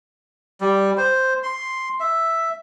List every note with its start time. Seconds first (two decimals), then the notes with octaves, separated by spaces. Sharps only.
0.61 G3
0.97 C5
1.43 C6
2.00 E5